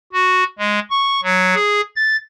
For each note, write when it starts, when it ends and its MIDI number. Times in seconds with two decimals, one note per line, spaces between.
0.13 0.44 66
0.59 0.80 56
0.90 1.20 85
1.23 1.55 54
1.55 1.81 68
1.96 2.16 93